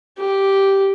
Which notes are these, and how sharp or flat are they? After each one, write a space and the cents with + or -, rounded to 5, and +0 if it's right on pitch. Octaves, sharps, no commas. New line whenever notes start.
G4 -5